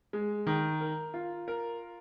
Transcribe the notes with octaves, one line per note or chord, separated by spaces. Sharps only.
G#3
D#3
A#4
F4
A#4